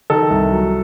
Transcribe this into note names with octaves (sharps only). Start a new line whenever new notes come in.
D#3 A4
C2
F#3